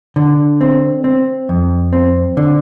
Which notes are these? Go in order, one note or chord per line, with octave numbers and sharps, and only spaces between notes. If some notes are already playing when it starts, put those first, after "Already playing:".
D3
C4
C4
F2
C4
D3